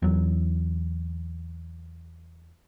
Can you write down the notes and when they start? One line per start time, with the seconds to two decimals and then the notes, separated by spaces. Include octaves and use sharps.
0.02 E2 F#3